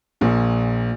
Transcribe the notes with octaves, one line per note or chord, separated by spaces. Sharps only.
A#1 A#2